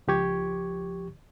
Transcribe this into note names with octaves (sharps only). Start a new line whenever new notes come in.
C#2 F3 G4 C#6 G#6